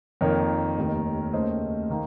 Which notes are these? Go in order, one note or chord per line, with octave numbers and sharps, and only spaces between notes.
F2 D#3 A#3 A#4 C#5
F1 D#2 D#3
D#2 C#3 A3 C5 D#5
D#3 A#3